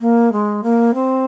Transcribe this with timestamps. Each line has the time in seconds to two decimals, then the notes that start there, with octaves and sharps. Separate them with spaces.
0.01 A#3
0.32 G#3
0.63 A#3
0.94 C4